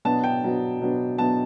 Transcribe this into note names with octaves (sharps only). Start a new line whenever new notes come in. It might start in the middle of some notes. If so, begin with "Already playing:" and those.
B2 F#3 B3 D4 A5
G5
B2 F#3 B3 D4
B2 F#3 B3 D4
B2 F#3 B3 D4 A5